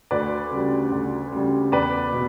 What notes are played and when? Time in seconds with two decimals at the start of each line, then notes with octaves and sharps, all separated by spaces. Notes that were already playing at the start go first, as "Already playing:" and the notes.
0.11 D2 B4 D5
0.51 C#3 G3
0.92 D2
1.32 C#3 G3
1.72 E2 B4 D5
2.13 B2